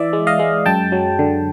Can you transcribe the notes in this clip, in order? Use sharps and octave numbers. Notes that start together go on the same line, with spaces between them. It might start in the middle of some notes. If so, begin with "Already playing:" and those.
Already playing: E3 D5 E5
G#3
D#5 F5
G#3
F#2 G5 A5
F#3
D3